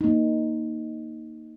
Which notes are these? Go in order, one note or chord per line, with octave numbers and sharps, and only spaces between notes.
A#3 D#4